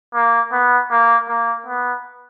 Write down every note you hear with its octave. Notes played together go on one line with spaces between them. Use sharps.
A#3
B3
A#3
A#3
B3